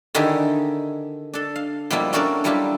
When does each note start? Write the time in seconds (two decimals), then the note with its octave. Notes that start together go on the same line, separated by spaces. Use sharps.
0.15 D3 D#3 D#4 E4 G4 G#4
1.34 D4 A4
1.56 F5
1.90 B2 F3 G3 A#3 E4
2.13 C#4 D4 F#4 A4 A#4 D5
2.44 F#3 G3 D4 E4 F4 G4